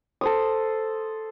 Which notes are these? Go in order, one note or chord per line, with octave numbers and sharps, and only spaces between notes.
A4 C5 D#6